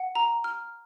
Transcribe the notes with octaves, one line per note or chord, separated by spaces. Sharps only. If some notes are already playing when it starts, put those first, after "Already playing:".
Already playing: F#5
A#5
F6